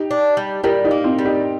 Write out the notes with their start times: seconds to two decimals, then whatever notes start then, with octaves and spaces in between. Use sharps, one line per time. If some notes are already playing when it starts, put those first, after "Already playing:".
Already playing: D#4 G4
0.11 D4
0.37 G3
0.64 G3 G4 A#4
0.84 D#4 G4
0.91 A#3
1.04 C4 D#4
1.19 G3
1.25 D#4 G4